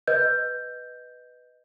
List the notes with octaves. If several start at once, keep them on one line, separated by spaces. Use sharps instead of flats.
B4 D#5 G6